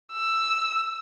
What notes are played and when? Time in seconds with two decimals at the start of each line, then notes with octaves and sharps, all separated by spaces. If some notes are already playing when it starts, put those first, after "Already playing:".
0.12 E6